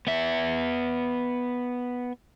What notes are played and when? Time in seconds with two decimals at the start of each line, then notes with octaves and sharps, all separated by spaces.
0.07 B3 E5